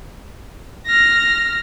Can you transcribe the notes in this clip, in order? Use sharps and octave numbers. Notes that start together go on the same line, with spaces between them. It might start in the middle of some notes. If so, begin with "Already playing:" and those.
F6 A#6